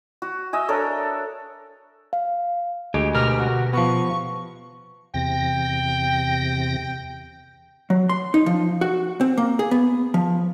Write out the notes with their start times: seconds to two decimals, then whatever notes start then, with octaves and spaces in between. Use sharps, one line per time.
0.22 F#4
0.53 D#5 E5 G#5
0.68 D4 A4 A#4 C#5
2.13 F5
2.94 D2 G#3 G4 G#5
3.14 B2 G4 A#4 F6
3.38 F#4
3.73 F3 B3 C#6
5.14 E2 C3 G5 A#6
7.90 F#3
8.09 C6
8.34 D#4
8.46 F3
8.81 F#4
9.21 C4
9.38 A#3
9.59 G#4
9.71 B3
10.14 F3